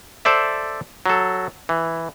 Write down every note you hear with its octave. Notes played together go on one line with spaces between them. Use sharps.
A4 C5 D5 E5
F#3 A4
E3